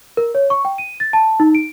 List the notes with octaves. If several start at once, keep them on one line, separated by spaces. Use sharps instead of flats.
A#4
C#5
C#6
G5
D#7
A6
A5
D#4
D7